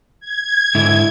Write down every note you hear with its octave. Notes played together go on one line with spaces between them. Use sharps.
G#6
G#2 D3 E4